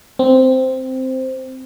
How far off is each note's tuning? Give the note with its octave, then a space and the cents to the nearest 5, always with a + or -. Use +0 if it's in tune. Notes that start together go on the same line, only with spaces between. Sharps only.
C4 -5